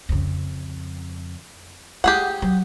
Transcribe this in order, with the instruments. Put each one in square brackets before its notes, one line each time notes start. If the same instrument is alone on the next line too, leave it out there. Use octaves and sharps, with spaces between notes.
[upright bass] F2 C#3
[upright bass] G#3 [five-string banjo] G4 G#4 F#5
[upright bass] F#3